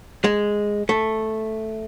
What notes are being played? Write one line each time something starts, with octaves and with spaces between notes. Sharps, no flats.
G#3
A3